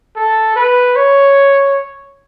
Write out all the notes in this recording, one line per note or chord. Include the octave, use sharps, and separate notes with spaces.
A4
B4
C#5